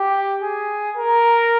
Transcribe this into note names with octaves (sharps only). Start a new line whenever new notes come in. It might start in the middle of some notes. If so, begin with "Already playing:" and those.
Already playing: G4
G#4
A#4